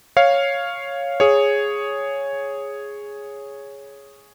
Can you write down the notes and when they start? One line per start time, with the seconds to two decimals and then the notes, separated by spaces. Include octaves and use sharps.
0.17 C#5 F5
1.20 G#4 C#5